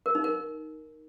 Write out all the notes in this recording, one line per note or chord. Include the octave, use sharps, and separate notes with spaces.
A#4
D#4
A#4